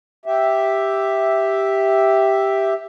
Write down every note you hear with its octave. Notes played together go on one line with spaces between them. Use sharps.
G4 E5